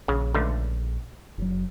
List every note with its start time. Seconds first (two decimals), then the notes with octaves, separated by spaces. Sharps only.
0.08 A#1 C#3
0.34 C#2 D3 A3
1.38 F#1 F#3